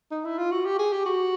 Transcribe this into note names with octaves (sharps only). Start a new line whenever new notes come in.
D#4
E4
F4
F#4
G4
G#4
G4
F#4